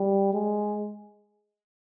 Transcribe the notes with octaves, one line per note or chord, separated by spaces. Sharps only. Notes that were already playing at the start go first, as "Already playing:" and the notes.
Already playing: G3
G#3